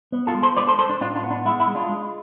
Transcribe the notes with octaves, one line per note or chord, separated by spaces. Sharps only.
B3
F4 A4
G#3
A4 C5
D4 B4 D5
A4 C5
D4 A4 C5
D4
A2 D4 F4
D4 F4
B3
D4
G#3 E4
E4
G#3
D4 F4
G#3